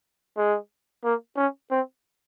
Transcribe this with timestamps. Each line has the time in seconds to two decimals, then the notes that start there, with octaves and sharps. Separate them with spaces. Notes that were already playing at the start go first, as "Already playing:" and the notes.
0.37 G#3
1.04 A#3
1.36 C#4
1.71 C4